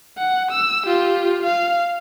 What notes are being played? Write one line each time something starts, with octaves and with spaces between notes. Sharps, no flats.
F#5
E6
F4 G4
F5